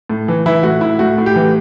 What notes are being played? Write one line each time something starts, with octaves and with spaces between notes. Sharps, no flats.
A2
E3
E3 E4
A2 F#4
A2 E4
A2 F#4
A2
G4
E3